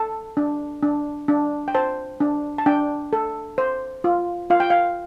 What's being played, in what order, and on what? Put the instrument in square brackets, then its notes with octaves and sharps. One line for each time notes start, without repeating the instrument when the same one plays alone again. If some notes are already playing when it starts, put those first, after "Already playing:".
Already playing: [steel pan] A4 A5
D4
D4
D4
G5
C5 A5
D4
A5
D4 G5
A4
C5
F4
F4 F5
G5
F5